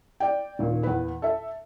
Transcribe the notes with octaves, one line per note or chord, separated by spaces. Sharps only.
D5 G5
D#1 A#2 D#3
E2 B4
A4 E5